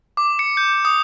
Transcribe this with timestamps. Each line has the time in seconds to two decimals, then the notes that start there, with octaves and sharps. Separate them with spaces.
0.17 D6
0.39 C#7
0.57 G6
0.85 D#6